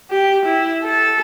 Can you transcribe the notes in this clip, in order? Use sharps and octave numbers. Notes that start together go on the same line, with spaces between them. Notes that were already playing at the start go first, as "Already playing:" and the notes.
G4
E4
A4